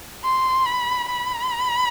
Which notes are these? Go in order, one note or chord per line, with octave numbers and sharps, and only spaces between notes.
C6
B5
B5